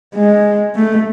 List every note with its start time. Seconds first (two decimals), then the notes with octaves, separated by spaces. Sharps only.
0.15 G#3
0.75 A3